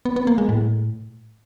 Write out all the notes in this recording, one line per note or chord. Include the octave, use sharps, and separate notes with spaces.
B3
B3
A#3
G#3
A2